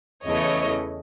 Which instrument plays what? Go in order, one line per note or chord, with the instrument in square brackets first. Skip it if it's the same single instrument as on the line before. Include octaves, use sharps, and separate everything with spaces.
[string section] E2 C#3 E3 A3 [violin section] C#5 D#5